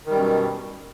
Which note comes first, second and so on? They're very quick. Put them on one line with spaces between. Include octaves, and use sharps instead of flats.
D#3 G3 F#2 B2